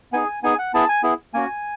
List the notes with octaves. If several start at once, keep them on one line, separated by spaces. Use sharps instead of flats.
B3 D#4 G#4 G#5
B3 D#4 G#4 G#5
F#5
B3 E4 G#4 A5
G#5
B3 E4 G#4
A#3 C#4 F#4 G#5